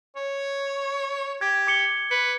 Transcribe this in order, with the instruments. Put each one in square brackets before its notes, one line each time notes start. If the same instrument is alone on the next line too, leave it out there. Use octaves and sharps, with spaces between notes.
[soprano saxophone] C#5
[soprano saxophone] G4 [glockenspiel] G#6
[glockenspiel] D6 C#7 G7
[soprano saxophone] B4 [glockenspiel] C#7